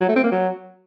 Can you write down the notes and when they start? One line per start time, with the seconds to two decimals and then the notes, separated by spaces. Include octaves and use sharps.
0.01 F#3
0.08 A3
0.16 C4
0.24 A#3
0.31 F#3